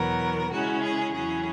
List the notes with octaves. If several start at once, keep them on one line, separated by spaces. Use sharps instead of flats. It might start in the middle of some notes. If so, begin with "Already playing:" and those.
Already playing: E2 B2 F#3 B3 A#4
C#3 G#3 C#4 E4 F#4
G#4
E2 C#3 F#3 C#4 E4 G#4